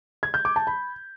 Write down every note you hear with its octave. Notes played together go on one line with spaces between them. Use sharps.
G#6
G6
D6
A5
B5